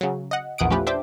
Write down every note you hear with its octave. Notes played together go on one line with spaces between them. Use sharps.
C#3 F#3
D#5 F#5
A#1 E2 F#5 D#6 D7
F3 A3 C#4 G4 B4
D4 C5 E5 G5 D6